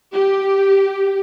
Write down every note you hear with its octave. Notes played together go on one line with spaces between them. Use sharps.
G4